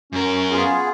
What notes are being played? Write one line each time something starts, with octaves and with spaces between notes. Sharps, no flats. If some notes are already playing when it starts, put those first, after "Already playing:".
F#2 C#4 A#4
B3 F4 G#4